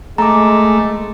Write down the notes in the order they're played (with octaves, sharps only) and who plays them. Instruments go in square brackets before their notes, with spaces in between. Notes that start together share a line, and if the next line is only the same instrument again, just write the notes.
[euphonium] G#3 [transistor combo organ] A3 [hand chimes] A#5 D6